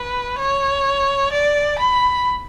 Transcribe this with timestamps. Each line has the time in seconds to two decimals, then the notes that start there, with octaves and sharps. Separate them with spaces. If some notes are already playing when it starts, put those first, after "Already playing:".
Already playing: B4
0.39 C#5
1.32 D5
1.79 B5